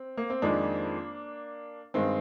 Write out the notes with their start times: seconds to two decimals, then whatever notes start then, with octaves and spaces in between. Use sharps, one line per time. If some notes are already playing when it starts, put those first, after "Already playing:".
Already playing: C4
0.17 A#3
0.30 C4
0.42 F2 D#3 G#3 A#3 D4
1.94 G2 D#3 G#3 C4